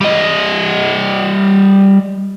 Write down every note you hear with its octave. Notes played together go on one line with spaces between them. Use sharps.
G3 D#5